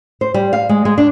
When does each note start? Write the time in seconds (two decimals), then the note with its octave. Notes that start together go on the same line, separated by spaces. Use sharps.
0.21 C5
0.34 G3
0.53 F5
0.69 G#3
0.85 G#3
0.98 D4